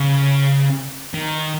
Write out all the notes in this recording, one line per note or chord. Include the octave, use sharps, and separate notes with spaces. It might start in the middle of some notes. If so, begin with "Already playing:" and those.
Already playing: C#3
D#3